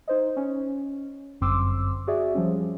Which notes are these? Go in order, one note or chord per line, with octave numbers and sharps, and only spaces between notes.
D#4 C5 D#5
C#4
G1 F#2 C4 C6 D6 E6
F#4 G#4 D5 E5
F3 G3 C#4